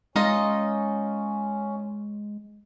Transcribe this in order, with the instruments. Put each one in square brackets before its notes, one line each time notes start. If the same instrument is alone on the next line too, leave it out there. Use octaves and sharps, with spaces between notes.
[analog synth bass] G#3 [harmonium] C#4 [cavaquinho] D#4 F4 D#5